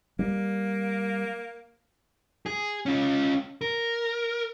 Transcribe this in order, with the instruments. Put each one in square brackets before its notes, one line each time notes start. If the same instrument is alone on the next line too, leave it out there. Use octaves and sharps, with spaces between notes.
[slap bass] G3 [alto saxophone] A#3
[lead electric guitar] G#4
C#4 F4
A#4